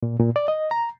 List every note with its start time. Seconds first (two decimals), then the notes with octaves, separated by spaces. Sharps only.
0.03 A#2
0.19 A#2
0.36 D5
0.48 D#5
0.71 A#5